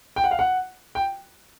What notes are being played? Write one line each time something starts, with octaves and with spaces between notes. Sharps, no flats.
G5
F#5
F5
F#5
G5